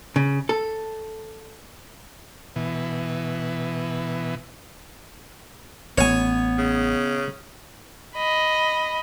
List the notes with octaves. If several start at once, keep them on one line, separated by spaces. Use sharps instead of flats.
C#3
A4
B2 E3
A1 B3 C#5 G#5
C#3
D#5 B5